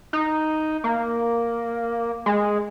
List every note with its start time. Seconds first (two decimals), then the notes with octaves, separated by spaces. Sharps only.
0.13 D#4
0.84 A#3
2.26 G#3